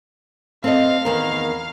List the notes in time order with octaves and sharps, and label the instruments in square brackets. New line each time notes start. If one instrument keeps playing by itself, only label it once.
[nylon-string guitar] C4 A4 D#5 [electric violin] F5
[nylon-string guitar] E2 D#3 A#4